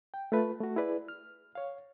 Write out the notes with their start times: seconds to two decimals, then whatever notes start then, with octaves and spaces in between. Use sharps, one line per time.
0.14 G5
0.32 A3 F4 B4 B5
0.61 A3 F#4
0.76 E4 G#4 B4 D5
1.08 F6
1.55 C#5 F5